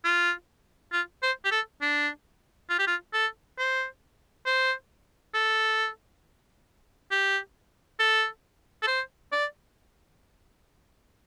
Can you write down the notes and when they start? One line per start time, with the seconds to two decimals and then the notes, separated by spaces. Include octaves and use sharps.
0.05 F4
0.92 F4
1.23 C5
1.45 G4
1.51 A4
1.82 D4
2.70 F4
2.79 G4
2.87 F4
3.13 A4
3.58 C5
4.46 C5
5.34 A4
7.11 G4
7.99 A4
8.82 A4
8.88 C5
9.32 D5